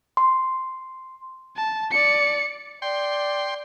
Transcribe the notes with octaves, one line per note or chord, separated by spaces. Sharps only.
C6
A5
D5 C#7
D5 G5 C6